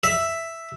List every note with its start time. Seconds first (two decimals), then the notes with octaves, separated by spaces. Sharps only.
0.04 E5